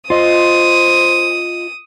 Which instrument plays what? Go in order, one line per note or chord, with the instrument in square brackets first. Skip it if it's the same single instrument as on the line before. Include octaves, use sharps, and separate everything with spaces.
[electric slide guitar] F4 D#5 [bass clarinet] C5 [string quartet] D#6